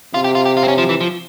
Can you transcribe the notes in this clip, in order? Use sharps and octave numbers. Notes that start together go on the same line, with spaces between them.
C3 F4
G4
F4
G4
F4
C4
C#4
F3
E3
F3